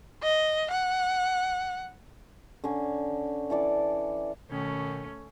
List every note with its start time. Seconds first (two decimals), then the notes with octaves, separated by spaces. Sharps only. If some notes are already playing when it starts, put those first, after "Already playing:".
0.23 D#5
0.71 F#5
2.64 D3 C#4
3.50 E3 A4 D5
4.50 B2 D#3 A3 C#4